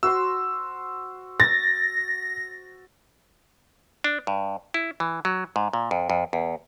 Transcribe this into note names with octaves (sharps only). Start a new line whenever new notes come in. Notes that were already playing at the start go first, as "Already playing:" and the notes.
F#4 C5 C6 E6
A6 A#6
D4
G2
E4
E3
F#3
G#2
A#2
F2
F2
E2